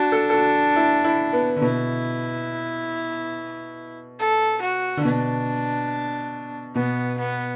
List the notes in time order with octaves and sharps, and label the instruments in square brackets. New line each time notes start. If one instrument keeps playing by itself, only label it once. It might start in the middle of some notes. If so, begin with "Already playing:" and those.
Already playing: [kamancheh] D4 [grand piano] F#4
[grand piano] A4
A4
F#4
E4
E4
B3
D3
[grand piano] B2 [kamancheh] E4
[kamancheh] A4
F#4
[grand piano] D3
[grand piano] B2 [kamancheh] D4
[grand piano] B2 [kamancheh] B3
[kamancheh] B3